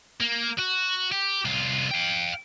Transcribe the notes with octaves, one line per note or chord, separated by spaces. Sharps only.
A#3
F#4
G4
C2 F4
F5 G5